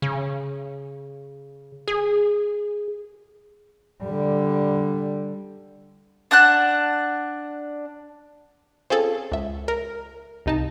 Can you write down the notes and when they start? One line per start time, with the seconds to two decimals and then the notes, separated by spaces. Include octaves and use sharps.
0.02 C#3
1.88 G#4
4.03 D3 G3
6.31 D4 F#5 A5 F#6
8.90 C4 C#4 F4 G#4 A4
9.32 C#2 E5
9.68 A#4
10.46 C2 D#4 A5